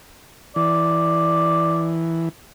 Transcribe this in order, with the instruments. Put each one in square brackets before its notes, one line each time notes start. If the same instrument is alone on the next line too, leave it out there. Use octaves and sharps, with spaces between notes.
[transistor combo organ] E3 [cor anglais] D5